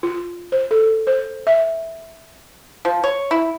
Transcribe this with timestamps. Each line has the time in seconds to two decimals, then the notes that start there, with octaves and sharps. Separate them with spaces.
0.03 F4
0.52 C5
0.71 A4
1.07 C5
1.47 E5
2.85 F3
3.04 C#5
3.31 E4